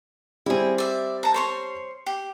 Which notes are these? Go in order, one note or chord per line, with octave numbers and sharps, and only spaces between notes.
G3 C4 E4 G#4
D5 E5
A5 A#5
C5 C#5 C6
G4